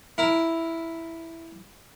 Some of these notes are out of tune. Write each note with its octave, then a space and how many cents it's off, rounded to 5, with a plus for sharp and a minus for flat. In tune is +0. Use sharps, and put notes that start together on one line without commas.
E4 +0 A#4 +0